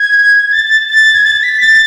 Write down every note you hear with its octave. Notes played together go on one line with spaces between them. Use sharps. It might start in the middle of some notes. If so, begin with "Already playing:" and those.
Already playing: G#6
A6
A6
G#6
A6
B6
A6